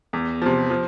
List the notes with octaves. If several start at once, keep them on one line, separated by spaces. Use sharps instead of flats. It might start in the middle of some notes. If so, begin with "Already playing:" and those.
E2
C3 F3
F3